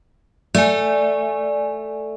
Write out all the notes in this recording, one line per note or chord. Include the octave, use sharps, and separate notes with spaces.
A3 D5 G#5